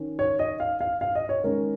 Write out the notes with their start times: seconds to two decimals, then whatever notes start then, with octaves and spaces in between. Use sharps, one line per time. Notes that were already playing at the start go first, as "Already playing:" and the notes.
Already playing: D#3 C#4
0.19 C#5
0.39 D#5
0.60 F5
0.81 F5
1.01 F5
1.15 D#5
1.29 C#5
1.43 D#3 G#3 C#4 A#4